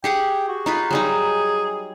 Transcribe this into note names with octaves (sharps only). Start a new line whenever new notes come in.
G4 G#4 F#5 G5
F#4
D#4 F4 B4
F#3 G3 D#4 G#4